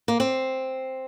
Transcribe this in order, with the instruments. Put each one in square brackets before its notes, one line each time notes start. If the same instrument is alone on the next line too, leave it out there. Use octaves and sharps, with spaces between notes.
[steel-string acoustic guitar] A#3
C4